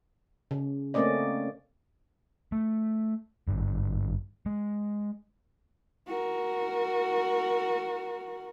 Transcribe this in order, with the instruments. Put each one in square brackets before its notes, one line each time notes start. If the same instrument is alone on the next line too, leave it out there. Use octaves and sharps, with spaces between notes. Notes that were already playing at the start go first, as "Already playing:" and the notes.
[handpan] C#3
A3 A#3 C4 C#4 D5 D#5
[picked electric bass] A3
G#1 G2
G#3
[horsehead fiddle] F#4 A#4